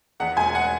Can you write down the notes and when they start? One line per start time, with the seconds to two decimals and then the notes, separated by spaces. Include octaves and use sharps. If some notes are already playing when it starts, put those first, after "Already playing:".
0.20 E2 F#5
0.37 E1 G#5
0.55 F#5